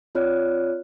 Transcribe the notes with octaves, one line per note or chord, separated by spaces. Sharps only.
C4 F4 C#5 D5 F6 F#6